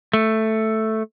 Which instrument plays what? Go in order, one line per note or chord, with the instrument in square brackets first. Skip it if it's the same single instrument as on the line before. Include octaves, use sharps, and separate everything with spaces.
[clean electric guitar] A3